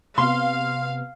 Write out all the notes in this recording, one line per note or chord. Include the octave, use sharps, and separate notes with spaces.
C3 B3 F5 C6